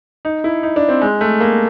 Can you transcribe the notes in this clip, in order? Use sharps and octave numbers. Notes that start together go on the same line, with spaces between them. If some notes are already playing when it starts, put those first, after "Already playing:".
D#4
E4
D#4
D4
C4
G#3
A3
A#3